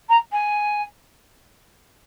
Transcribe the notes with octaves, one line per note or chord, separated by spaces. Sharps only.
A#5
G#5